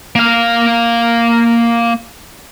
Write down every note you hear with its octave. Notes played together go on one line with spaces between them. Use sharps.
A#3 F5